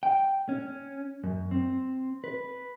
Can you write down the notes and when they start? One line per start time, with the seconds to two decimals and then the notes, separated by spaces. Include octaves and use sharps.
0.03 G5
0.49 C#4
1.24 F#2
1.51 C4
2.24 B4